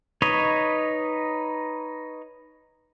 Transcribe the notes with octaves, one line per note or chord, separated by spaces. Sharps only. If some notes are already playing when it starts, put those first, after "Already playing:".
D#4 B4 C#5 D#5